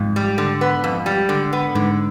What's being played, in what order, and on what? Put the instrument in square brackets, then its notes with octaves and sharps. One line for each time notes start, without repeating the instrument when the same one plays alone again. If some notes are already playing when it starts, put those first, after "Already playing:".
Already playing: [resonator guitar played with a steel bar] F2 [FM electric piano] G#2
[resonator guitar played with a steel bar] G3
D3
B3
F2
G3
D3
B3
[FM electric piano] G#2 [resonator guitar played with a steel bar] D3